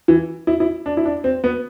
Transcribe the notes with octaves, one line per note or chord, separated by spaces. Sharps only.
E3
E4
E4
D4
E4
D4
C4
B3